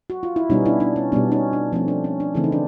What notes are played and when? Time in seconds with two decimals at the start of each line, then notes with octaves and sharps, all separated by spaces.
0.10 F#4
0.23 F4
0.36 E4
0.50 B2 G3 B3 C#4 D#4
0.65 D4 E4
0.80 D4
0.96 C#4
1.12 B2 G3 B3 D4
1.32 C#4 D#4
1.53 D4
1.73 F3 A3 C4 C#4
1.88 D4
2.04 C#4
2.20 D4
2.35 C#3 E3 A3 C4 E4
2.44 D#4
2.52 D4